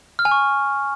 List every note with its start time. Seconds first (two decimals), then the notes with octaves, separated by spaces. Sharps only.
0.19 F6
0.25 G#5
0.32 C#6